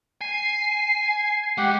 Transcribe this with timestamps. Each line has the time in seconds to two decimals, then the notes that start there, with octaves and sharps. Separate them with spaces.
0.21 G#5 C7
1.58 G#3 G4 F#5